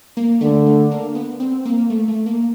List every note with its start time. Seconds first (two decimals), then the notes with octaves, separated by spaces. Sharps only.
0.17 A#3
0.41 D3 A3
0.66 A3
0.91 A#3
1.15 B3
1.40 C4
1.65 A#3
1.90 A3
2.08 A3
2.26 A#3